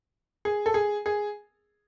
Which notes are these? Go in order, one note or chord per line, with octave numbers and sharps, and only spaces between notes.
G#4
A4
G#4
G#4